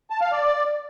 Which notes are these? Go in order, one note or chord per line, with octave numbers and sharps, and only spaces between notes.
A5
F5
D5